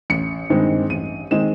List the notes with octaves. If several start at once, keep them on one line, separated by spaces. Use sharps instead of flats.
A1 C#7
G2 D#3 G#3 C4
A1 D#7
D#3 G#3 C4 E7